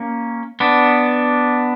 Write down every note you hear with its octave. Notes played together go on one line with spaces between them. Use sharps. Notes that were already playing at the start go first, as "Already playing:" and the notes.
Already playing: A#3 C#4
B3 D4